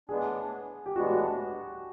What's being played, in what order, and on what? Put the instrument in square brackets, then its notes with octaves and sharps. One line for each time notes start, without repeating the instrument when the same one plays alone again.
[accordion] A2 E3 G#3 B3 D4 [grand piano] G#4
[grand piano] G4
[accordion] A2 E3 G#3 B3 D4 [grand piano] F#4